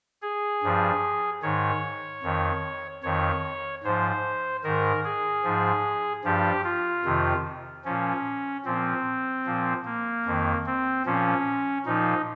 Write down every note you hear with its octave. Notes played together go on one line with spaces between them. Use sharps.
G#4
G2 F3
G#2 D#3 C#5
F2 D#3
F2 D#3 C#5
G#2 F3 C5
G#2 D#3 A#4
G#4
G#2 F3
G2 F3 G4
F4
F2 C3 D#3
A#2 F3 C#4
A#2 F3 C4
A#2 F3
A#3
F2 D#3
C4
A#2 F3 C#4
A#2 F3 D#4